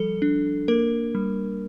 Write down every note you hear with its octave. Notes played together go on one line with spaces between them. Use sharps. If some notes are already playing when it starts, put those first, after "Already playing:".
Already playing: F3 G3 A4
D4
A#3 A#4
G3